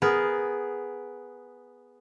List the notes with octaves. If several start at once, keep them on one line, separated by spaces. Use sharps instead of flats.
B3 G#4 A#4